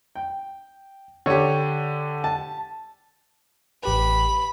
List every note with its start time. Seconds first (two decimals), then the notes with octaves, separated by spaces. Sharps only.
0.15 G5
1.26 D3 G4 C#5
2.24 A5
3.83 A1 G4 B4 B5